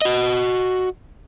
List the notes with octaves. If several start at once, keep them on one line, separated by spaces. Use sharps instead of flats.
F#4 D#5